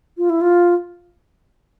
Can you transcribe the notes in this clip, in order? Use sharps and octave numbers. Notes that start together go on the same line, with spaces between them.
F4
E4
F4